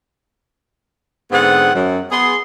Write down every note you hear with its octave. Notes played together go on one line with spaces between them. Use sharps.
G#2 D3 B3 C4 G#4 F#5
F#2
B3 G#4 C6